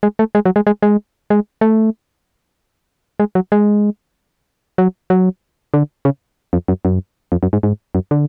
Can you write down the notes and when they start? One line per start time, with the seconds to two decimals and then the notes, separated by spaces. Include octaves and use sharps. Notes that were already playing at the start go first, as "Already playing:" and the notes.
0.03 G#3
0.19 A3
0.35 G#3
0.45 F#3
0.56 G#3
0.67 G#3
0.82 G#3
1.30 G#3
1.61 A3
3.20 G#3
3.35 F#3
3.52 G#3
4.78 F#3
5.10 F#3
5.74 D3
6.05 C#3
6.53 F2
6.68 F#2
6.85 F#2
7.32 F2
7.43 F#2
7.53 G#2
7.63 G#2
7.95 F#2
8.11 D3